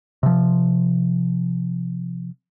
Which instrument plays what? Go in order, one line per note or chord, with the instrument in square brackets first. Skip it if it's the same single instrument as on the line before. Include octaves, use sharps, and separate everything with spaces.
[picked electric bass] C3 F3